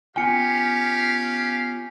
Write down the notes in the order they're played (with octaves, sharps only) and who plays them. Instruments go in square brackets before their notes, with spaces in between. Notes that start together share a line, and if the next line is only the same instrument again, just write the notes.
[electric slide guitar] B3 F4 G5 [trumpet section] C#4 G4 F5 [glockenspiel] G#5 C#7